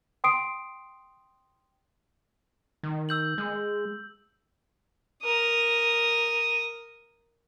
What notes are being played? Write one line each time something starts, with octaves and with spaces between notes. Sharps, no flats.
G5 C6 D#6 C7 D7
D#3
E6 G6 F#7
G#3
A#4 D#6